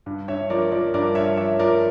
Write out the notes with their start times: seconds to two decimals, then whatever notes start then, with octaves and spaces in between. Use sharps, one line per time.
0.06 G2
0.28 G2 C#5 E5
0.50 F3 A#4 D5
0.72 F3 A#4 D5
0.94 G2 A#4 D5
1.15 G2 C#5 E5
1.37 F3 C#5 E5
1.59 F3 A#4 D5